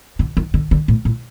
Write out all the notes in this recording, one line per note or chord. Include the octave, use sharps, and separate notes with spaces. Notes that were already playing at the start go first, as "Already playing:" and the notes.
D3
D#3
D3
D3
A2
A2